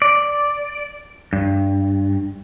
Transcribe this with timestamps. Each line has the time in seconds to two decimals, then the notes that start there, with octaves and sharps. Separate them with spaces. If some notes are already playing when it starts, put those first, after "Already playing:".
0.02 D5
1.33 G2